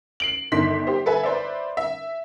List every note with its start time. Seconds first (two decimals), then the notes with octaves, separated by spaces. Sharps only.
0.20 C7 D7 F#7
0.52 G1 D#3 D4 C6 B6
0.87 G4 C5
1.06 A4 B4 E5 G#5
1.23 B4 C5 D5 E5
1.77 E5